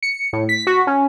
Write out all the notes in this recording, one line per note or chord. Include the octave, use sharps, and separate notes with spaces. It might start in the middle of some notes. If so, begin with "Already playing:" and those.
C#7
A2
B6
F#4
C#4